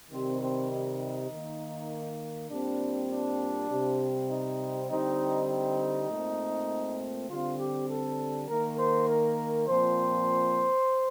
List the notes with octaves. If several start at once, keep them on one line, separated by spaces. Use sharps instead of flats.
C3 D#3 G3 C4
C4
D#4
D#3 A#3
A#2 G3 C4 D4
D4
C3 G3 C4
D#4
D3 G3 C4 D#4
D#4
A#2 A3 C4
D3 G3 C4 F4
G4
A4
D#3 A#3 A#4
C5
A#4
A#2 F3 C4 C5